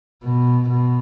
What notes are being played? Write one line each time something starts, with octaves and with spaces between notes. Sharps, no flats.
B2
B2